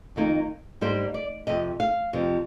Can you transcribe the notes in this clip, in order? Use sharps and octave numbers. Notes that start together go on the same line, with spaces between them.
F2 D#3 A#3 D#4
G#2 G3 A#3 D4 C5
D5
F2 C3 D#5
F5
F2 C3 F3